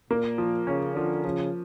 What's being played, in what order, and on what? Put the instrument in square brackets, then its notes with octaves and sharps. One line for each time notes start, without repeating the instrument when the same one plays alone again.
[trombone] A#2 [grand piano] A#3
[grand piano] F3
[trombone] C#3 [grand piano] C#4
[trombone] D3 [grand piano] F3
[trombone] C#3 [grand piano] F3